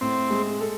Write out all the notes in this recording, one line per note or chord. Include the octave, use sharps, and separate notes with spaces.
A2 C4
G#3
A4